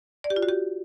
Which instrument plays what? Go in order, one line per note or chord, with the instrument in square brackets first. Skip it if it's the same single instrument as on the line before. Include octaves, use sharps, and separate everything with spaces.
[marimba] D5
G4
F4
F#4
G4